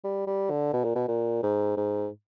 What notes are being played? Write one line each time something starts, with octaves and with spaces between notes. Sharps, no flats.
G3
G3
D3
B2
A#2
B2
A#2
G#2
G#2